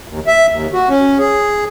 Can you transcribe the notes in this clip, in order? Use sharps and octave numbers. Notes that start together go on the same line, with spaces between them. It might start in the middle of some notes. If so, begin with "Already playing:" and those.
D#2
E5
D#2
F#4
C#4
G#4